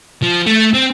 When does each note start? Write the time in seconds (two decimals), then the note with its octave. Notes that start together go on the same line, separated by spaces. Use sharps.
0.23 F3
0.47 A3
0.74 C4